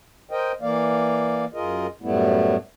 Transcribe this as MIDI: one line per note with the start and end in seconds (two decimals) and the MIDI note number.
0.31 0.52 70
0.31 0.52 72
0.31 0.52 75
0.31 0.52 79
0.62 1.45 52
0.62 1.45 58
0.62 1.45 74
0.62 1.45 77
1.54 1.87 42
1.54 1.87 65
1.54 1.87 68
1.54 1.87 70
1.54 1.87 75
2.02 2.56 42
2.02 2.56 45
2.02 2.56 55
2.02 2.56 57
2.02 2.56 59
2.02 2.56 64